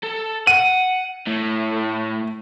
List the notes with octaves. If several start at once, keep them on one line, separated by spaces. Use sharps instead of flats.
A4
F#5 D#7
A2 A3